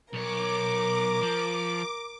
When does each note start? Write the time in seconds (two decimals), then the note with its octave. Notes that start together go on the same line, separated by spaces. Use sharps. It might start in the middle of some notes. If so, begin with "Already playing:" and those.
0.14 B1 A#4 C#5 D6
1.22 F3